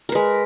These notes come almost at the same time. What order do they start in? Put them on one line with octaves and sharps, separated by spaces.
A#4 B4 G#3